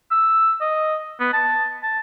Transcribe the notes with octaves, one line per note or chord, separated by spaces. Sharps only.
E6
D#5
B3
A5
A5